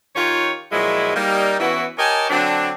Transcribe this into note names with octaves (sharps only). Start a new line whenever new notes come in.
D#3 F4 G4 C#5
A#2 F3 F#3 G#3 E4
G3 A#3 D#4
E3 B3 C#4 E4 F#4
G4 A#4 C#5 D#5 G#5 A5
D3 F#3 C4 D4